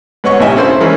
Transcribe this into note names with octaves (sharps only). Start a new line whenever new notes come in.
G#2 B3 B4 C#5 D#5 C#6
A1 C3 D#4 D#5 E5 G#5
C#4 E4 A4 C5 F5 C6
E3 G#3 A#3 C#4 E4